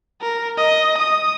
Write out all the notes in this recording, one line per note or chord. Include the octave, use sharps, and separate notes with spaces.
A#4
D#5
D#6